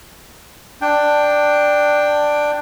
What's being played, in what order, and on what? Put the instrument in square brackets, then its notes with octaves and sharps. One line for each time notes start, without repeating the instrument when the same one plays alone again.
[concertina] D4 G5